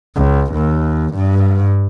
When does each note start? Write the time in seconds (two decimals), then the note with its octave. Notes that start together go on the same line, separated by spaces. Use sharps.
0.16 C#2
0.53 D#2
1.14 G2